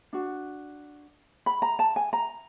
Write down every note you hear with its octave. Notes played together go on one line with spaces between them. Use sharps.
D4 F#4
B5
A#5
A5
G#5
A#5